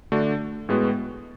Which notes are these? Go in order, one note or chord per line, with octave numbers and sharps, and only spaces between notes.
D3 A3 D4 F#4
A2 G#3 B3 F#4